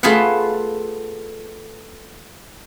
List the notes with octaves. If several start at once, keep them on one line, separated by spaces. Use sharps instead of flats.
A3 F4 G#4 B4 E5 F#5